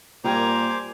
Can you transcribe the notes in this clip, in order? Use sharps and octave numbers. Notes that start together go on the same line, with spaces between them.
A#2 G3 A#4 C5 G5 G#5 A#5 D6